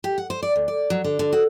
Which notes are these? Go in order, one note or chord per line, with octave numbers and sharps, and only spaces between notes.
G4
F#5
C5
D5
D2
D5
F#3
D3
D3
F#4